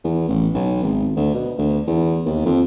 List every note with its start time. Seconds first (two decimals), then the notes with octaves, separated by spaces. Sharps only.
0.04 E2
0.28 A1
0.54 B1
0.83 G#1
1.16 D2
1.35 B2
1.58 D2
1.87 E2
2.26 D#2
2.46 F2